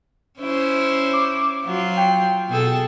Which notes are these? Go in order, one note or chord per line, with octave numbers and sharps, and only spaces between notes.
C#4 E4 C5
D6
F#3 F4
G5
B2 G#4 A4